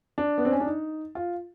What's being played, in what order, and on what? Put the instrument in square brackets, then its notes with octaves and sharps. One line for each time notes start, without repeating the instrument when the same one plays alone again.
[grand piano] D4
B3
C4
C#4
D4
D#4
F4